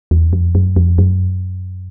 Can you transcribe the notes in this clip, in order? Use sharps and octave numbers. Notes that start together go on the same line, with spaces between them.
E2
F2
F#2
F2
F#2